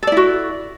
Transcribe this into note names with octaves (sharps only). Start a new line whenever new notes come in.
E4 F#4 A4 D5